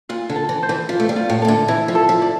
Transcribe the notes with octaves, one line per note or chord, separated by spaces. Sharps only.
A#2 F4
D3
A4
E3
C5
E3
F3 F4
A3
G3
F4
A2
C3 A4
D3
E3 E4
F3
A4
F3
D5